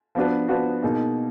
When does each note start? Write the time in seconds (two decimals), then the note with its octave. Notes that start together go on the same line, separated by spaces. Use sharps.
0.15 F3 B3 D4 F#4 B4
0.48 F3 B3 D4 F#4 B4
0.82 B2 A#3 D#4 G#4